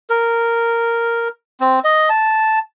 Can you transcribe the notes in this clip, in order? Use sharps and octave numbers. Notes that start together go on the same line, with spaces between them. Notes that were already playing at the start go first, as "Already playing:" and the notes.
A#4
C4
D#5
A5